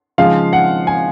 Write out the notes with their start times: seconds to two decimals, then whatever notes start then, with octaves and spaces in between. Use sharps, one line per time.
0.18 C#3 F3 G#3 D#4 F5
0.53 F#5
0.87 G#5